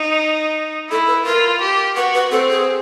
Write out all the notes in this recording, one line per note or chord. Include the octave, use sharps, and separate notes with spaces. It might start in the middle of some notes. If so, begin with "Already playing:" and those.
Already playing: D#4
E4 A4
B4
F4 A#4
G4
F#4 B4
B4
C4 A4
G#4